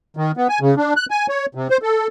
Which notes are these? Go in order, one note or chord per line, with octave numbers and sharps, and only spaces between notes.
D#3
B3
G#5
C#3
D4
F#6
G#5
C#5
C3
C5
A4